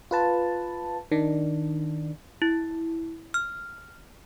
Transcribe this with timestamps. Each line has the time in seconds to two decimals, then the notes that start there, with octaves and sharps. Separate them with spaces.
0.11 F4 B4 A5
1.11 D#3 D4
2.42 E4
3.34 F6